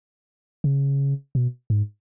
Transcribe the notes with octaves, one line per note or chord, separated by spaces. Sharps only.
C#3
B2
G#2